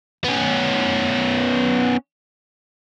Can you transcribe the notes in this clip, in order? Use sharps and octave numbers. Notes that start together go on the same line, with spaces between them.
B3 C#4